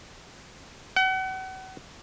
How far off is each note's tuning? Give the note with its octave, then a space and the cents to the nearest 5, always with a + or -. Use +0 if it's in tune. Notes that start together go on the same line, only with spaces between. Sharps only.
F#5 +35